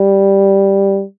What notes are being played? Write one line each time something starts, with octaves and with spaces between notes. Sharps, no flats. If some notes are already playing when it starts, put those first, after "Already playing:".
Already playing: G3